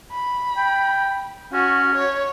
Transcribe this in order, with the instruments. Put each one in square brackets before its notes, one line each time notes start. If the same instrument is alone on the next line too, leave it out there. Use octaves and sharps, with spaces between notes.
[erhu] B5
[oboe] G5
[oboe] C#4 [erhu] F#4
[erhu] C#5